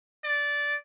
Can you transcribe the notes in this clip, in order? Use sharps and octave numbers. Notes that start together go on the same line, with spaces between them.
D5